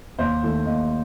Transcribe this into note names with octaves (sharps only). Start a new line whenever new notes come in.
D#2 C5
D#3 A3
D#2 D#5